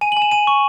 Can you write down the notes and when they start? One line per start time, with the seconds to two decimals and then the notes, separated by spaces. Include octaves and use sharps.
0.01 G#5 D#7
0.12 F#7
0.17 G#5
0.22 E7
0.31 G#5 D#7
0.47 C#6